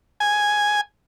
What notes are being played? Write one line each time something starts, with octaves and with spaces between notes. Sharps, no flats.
G#5